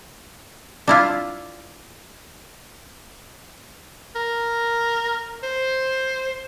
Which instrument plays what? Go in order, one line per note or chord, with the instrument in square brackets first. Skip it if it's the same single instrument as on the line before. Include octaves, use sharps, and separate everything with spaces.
[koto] D4 E4 F4
[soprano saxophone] A#4
C5